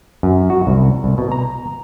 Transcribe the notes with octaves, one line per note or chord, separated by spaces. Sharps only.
F#2
F#4
C2
C2
B2
A#5